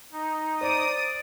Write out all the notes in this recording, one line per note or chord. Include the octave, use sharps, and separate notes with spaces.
D#4
C5 D5 D#6